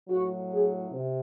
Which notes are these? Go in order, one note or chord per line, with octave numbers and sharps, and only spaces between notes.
A2 F#3 F#4
G#4
C3